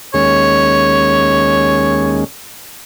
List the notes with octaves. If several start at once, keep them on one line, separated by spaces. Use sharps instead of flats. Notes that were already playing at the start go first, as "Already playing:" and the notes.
D#2 G#3 C#4 C#5